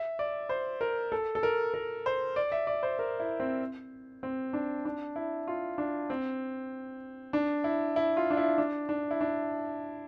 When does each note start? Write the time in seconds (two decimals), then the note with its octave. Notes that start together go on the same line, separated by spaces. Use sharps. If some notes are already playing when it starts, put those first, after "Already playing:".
Already playing: E5
0.19 D5
0.49 C5
0.81 A#4
1.12 A4
1.35 A4
1.43 A#4
1.74 A#4
2.06 C5
2.36 D5
2.52 E5
2.67 D5
2.83 C5
2.99 A#4
3.20 E4
3.40 C4
4.23 C4
4.53 D4
4.85 D4
5.16 E4
5.47 F4
5.78 D4
6.10 C4
7.33 D4
7.64 E4
7.96 E4
8.17 F4
8.30 D4
8.37 E4
8.58 D4
8.89 D4
9.11 E4
9.21 D4